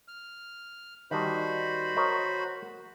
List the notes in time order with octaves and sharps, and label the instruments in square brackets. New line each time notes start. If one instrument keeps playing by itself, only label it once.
[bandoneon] F6
[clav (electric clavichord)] D#3 G3 A5 [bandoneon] F#4 C5 B5
[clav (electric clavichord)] A#4 C#5 D#5